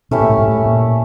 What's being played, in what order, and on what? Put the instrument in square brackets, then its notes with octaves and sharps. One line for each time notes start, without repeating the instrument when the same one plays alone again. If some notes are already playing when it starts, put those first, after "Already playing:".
[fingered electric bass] B2 [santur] A3 C#4 E4 G4
[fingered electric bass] A#2
A2
G#2
A2
A#2